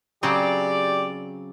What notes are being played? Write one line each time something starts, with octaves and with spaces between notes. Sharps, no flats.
C#3 F#3 C4 G4 D5